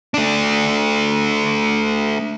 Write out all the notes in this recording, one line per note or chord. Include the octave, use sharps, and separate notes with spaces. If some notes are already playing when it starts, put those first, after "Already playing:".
A3 D4